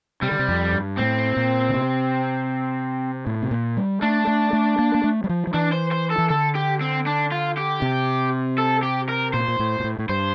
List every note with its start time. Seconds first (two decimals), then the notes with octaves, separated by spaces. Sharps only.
0.22 C3 G3
0.32 D3
0.39 C3
0.48 F2
0.73 G2
0.98 A2 C4
1.37 A#2
1.69 D3
1.74 C3
3.26 A2
3.43 C3
3.51 A#2
3.77 G3
4.02 A3 D4
4.27 A3
4.53 A3
4.79 A#3
4.95 A#3
5.04 A3
5.24 G3
5.29 F3
5.47 F3
5.54 E3 D4
5.73 C5
5.92 C5
6.11 A4
6.18 E3
6.30 D3 A4
6.55 G4
6.81 C4
7.06 D4
7.32 F4
7.57 G4
7.82 C3
8.58 A4
8.83 G4
9.09 A#4
9.34 A#2 C5
9.48 A#2
9.59 A2
9.80 A#2
9.84 A2
9.99 A2
10.09 G2 C5